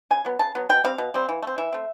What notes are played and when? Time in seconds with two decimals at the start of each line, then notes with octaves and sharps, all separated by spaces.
0.11 C#3 G#5
0.25 F#3 B3
0.39 C#3 A5
0.55 F#3 B3
0.69 B2 G5
0.84 G3 C4 F5
0.98 B2
1.14 G3 C4
1.29 E3
1.42 A3
1.47 C4
1.58 E3 E5
1.73 A3 C4